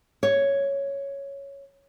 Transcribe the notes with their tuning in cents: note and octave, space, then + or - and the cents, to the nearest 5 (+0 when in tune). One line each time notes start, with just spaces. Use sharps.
C#5 +0